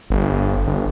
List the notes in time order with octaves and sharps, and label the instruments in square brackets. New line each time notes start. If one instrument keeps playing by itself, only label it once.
[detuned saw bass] G1
G1
G1